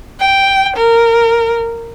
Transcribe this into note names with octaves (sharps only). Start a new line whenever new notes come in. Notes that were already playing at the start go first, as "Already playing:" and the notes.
G5
A#4